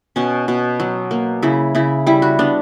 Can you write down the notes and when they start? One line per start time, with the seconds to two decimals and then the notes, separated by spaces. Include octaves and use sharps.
0.16 B2 C#4
0.48 B2
0.80 F#3
1.11 A#3
1.43 C#3 E4
1.75 C#3 E4
2.07 G3 E4
2.22 F#4
2.39 B3 D4